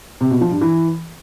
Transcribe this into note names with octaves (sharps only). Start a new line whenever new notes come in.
C3
B2
F3
G2
E3